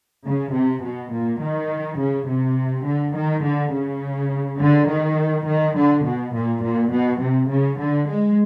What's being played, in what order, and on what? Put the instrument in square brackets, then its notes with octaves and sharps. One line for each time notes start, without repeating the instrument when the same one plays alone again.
[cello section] C#3
C3
B2
A#2
D#3
C#3
C3
D3
D#3
D3
C#3
D3
D#3
D#3
D3
B2
A#2
A#2
B2
C3
C#3
D3
G#3